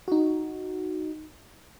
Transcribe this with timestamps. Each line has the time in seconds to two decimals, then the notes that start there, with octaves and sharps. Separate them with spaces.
0.08 D#4 F#4